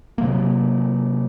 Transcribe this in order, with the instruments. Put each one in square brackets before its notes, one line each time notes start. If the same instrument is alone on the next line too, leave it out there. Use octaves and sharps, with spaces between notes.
[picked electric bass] C3 F#3 A#3